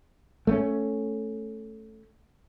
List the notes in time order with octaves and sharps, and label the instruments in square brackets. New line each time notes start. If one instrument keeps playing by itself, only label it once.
[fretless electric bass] A3 A#3 C#4